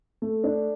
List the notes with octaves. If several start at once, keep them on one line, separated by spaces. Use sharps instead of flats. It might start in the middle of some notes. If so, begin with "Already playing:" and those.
A3
D4